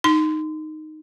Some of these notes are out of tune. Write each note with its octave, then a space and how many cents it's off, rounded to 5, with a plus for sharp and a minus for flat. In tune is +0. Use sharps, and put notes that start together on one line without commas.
D#4 -5 C6 -30